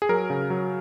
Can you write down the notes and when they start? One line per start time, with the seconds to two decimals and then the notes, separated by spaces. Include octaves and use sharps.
0.02 G#4
0.09 F#3 A#4
0.30 C#3
0.50 F#3